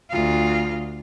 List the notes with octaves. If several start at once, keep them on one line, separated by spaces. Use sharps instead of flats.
D2 F4